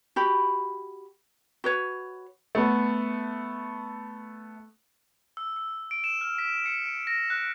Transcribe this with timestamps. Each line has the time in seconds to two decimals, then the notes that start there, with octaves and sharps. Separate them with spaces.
0.16 F#4 G4 B5
1.64 F#4 B4 C#5
2.55 A3 B3
5.37 E6
5.56 E6
5.91 D7
6.04 E7
6.21 F6
6.38 B6
6.66 C#7
6.86 D7
7.07 A#6
7.30 F#6